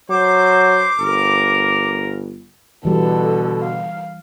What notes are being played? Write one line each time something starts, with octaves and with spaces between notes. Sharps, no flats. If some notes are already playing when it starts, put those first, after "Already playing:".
F#3 C5 D6
G1 A#4
B2 D3 E3 G3 A4
F5